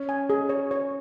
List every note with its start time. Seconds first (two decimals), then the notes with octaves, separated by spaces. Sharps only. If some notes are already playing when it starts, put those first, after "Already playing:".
Already playing: C#4
0.09 G#5
0.30 G#4
0.49 C#5
0.71 C#5